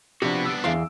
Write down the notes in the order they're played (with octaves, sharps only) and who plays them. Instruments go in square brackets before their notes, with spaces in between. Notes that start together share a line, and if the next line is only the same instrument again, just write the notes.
[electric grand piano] C3 F3 D4 [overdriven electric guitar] B3 F#4 [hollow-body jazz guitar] G4
[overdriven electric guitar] B3 D4 [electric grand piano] E6 D7
[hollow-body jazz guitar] E2 F5 C6